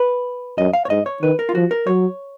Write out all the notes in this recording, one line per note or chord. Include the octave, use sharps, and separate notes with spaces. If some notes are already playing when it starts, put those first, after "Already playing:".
Already playing: B4
F#2 D#5
F5
C#5
G#2 D#5
C#5
D#3 B4
A#4
F4
F3 F#4
A#4
F#3 C#5